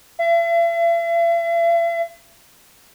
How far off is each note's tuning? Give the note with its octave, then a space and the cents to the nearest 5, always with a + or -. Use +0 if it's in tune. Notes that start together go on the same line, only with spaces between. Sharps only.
E5 +45